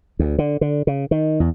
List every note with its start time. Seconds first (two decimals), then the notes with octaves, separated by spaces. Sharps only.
0.19 D2
0.39 D3
0.61 D3
0.87 C#3
1.11 D#3
1.40 E2